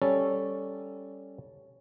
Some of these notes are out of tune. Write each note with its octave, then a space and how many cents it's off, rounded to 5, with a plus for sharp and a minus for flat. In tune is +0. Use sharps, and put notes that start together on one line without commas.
G3 +0 C#4 +0 A4 +0